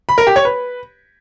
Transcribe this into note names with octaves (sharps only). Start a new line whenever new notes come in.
B5
A#4
G4
C#5
B4